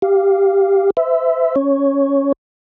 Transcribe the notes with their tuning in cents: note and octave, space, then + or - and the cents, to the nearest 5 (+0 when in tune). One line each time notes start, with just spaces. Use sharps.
G4 +0 F5 +0
C5 -40 E5 +0
C#4 +0 C#5 +0